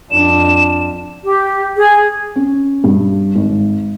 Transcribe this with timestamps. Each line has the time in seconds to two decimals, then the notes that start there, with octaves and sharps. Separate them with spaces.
0.11 F2 D4 E7
1.24 G4
1.77 G#4
2.36 C#4
2.84 G2
3.35 G#1